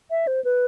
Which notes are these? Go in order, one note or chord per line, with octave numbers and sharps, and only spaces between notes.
E5
C5
B4